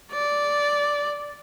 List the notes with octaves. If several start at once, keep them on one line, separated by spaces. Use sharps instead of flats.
D5